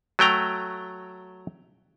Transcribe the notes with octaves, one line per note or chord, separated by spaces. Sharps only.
F#3 A3 G5 A#5